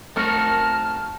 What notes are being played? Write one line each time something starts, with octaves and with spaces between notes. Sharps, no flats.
F2 A3 D#4 F#4 A#4 A5 F6